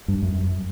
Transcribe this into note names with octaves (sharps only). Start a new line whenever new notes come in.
G2
F#2